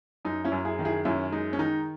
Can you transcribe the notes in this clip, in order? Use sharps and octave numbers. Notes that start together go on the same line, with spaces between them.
F#2 D#4
C#4 E4
F#2
E4 G#4
D#3
E4 G#4
F#2 C#4 E4
G#3 D#4
C#4
D#3 D#4